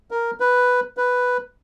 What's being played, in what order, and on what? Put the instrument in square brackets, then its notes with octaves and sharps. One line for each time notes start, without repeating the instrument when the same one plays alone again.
[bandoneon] A#4
B4
B4